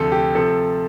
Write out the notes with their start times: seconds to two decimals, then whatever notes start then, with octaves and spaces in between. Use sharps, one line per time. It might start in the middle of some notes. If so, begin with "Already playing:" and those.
Already playing: D2 C3 F3 A3 A4
0.12 G4
0.35 C3 F3 A4